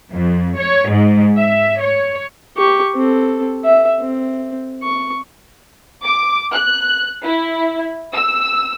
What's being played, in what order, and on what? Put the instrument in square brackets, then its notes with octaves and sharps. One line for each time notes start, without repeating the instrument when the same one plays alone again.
[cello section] F2
C#5
G#2
E5
C#5
[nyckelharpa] G4 C#6
C4 A4
E5
C4
C#6
[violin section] D6
F#6
E4
E6